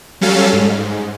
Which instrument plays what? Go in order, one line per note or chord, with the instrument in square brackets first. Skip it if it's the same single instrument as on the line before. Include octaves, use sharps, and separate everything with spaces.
[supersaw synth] F#3 G3 C#4 A4 F5
G#2